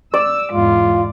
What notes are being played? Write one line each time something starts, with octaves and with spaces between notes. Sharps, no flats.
D5 E6
E2 G#2 F4